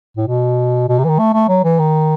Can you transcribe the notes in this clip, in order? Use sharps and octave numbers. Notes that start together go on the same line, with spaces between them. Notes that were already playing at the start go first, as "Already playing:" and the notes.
A2
B2
B2
C3
E3
D#3
A3
A3
F#3
E3
D#3